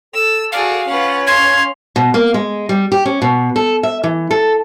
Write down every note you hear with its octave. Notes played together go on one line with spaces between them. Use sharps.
A4 E6
F#4 G#4 D5 F5
C#4 F4 B4 F#5
F5 C6 G#6
B2
A#3
G#3
G3
G4
C#4
B2
A4
E5
E3
A4